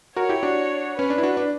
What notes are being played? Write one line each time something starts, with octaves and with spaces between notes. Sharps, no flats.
F#4 A#4 C#5
E4 G4
D4 F#4
C#4 B4
D4
E4
D4 F#4
D4